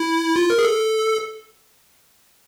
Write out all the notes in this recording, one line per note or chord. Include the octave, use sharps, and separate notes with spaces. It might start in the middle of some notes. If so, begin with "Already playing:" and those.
Already playing: E4
F4
A#4
G#4
A4